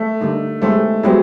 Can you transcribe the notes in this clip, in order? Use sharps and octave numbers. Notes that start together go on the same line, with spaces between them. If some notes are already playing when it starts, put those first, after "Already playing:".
Already playing: A3
D3 G3 A#3 D#4
G#3 A3 B3 E4 G4 C5
F#3 G#3 B3 E4 G4 C5